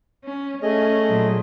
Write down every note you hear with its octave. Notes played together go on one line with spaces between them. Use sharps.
C#4
A3 C#4 G#4 D#5
A#2 F#3